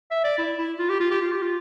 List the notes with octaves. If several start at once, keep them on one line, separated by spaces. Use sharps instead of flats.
E5
D5
E4
E4
F4
G4
F4
G4
F4
G4
F4